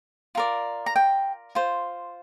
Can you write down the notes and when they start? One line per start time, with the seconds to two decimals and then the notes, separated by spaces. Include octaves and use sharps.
0.35 F4 A#4 D5
0.86 A#5
0.96 G5
1.55 F4 C5